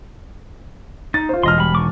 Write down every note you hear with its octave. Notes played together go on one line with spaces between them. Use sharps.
D#4 A6
F4 C5
E1 D#5 C6 F6
G3 B5
D#3 C#6 D6